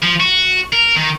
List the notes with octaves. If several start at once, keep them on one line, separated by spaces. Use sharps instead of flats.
F3
F#4
A#4
D#3